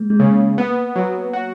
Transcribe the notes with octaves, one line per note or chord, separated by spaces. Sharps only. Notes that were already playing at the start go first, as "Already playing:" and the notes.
Already playing: G#3 A#3
G#3
C#3 A#3
A#3 B3
F#3
F#4